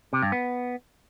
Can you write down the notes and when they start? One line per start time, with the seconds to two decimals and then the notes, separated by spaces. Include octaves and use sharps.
0.13 C3
0.22 G2
0.32 B3